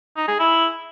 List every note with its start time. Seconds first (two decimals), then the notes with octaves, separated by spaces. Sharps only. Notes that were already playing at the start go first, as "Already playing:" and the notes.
0.17 D#4
0.28 G#4
0.39 E4